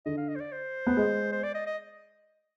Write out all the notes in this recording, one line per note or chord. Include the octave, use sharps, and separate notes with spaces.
D3 D#5
F5
D#5
C5
D5
C5
B3
G#3
C5
D5
D#5
D#5